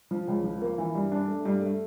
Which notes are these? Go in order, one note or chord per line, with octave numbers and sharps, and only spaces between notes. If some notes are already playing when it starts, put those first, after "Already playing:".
F3
C#2
F3
A#3
E3
G2
D4
A3
G2
A3